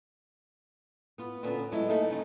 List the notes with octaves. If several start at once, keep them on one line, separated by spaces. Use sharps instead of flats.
B3 F4
A#2 D3 B3 C#4 F4
F#3 G#3 A3 E4
A3 A#3 D#4 G#4 A4 F5
C#3 A3 D#4